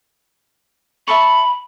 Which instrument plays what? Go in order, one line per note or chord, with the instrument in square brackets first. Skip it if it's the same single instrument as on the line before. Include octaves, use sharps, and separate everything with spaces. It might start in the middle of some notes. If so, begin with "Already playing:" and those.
[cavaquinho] E5 A5 C#6 [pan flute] B5